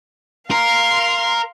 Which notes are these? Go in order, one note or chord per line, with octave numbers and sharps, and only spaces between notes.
A#4 F5 C6